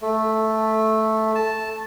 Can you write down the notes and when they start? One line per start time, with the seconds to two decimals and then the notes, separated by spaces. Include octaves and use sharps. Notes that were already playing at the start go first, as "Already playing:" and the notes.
0.01 A3
1.35 A5